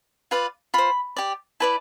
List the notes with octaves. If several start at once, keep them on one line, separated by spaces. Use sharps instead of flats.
F4 B4 D5
F4 C5 B5
G4 D5
E4 B4 D5 A5